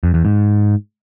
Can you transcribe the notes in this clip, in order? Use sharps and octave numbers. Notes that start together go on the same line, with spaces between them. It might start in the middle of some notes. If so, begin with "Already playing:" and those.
F2
E2
G#2